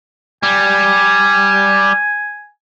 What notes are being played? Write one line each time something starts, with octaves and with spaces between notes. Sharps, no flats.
G3 G#5